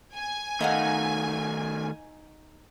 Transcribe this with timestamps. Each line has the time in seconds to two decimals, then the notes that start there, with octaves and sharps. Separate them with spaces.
0.14 G#5
0.61 D#3 A3 D#4 F5 F#5